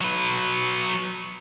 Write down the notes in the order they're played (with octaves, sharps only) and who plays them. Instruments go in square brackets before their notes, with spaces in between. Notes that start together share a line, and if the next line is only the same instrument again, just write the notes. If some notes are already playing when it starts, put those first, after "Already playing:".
[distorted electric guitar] F#3 B4